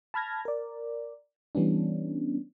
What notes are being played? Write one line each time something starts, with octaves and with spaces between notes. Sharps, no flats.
A5 B5 F6 G#6 A#6
A#4 D5
E3 G3 B3 C#4 D4